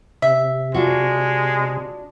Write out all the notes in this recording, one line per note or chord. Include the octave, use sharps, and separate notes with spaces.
C3 E5
G#3 D4 F4 F#4